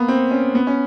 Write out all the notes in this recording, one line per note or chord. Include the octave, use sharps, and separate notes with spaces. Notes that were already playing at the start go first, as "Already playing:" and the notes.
Already playing: A#3 B3
C4
C#4
B3
C#4